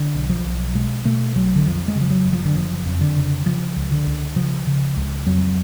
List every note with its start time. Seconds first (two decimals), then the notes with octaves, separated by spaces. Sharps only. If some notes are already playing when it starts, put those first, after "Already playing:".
Already playing: D3
0.15 B1
0.29 F3
0.45 B1
0.75 B2 G#3
1.05 B2 A3
1.36 B1 F#3
1.56 D3
1.66 F2 F3
1.88 G#3
1.96 C#3
2.01 F3
2.10 F#3
2.25 F#1
2.33 F3
2.45 D3
2.55 F#1 F3
2.85 F2
3.01 D3
3.16 C#3
3.46 C#3 F3
3.76 C#2
3.91 D3
4.06 C#2
4.36 C#3 F3
4.67 C#3
4.97 C#2
5.27 F2 F#3